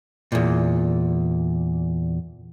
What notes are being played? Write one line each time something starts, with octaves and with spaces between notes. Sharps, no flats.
E2 A#2